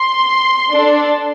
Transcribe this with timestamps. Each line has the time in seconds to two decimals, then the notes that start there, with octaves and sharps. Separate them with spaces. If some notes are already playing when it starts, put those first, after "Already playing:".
Already playing: C6
0.70 D4 A4